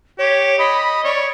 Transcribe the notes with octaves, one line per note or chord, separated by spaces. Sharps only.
G4 C#5
D#5 B5
C#5 D5